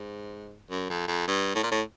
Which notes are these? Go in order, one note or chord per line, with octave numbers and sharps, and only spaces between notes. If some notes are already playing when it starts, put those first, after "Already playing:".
Already playing: G#2
F#2
F2
F2
G2
A2
A#2
A2